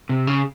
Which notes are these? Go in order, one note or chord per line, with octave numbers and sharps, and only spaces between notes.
C3
C#3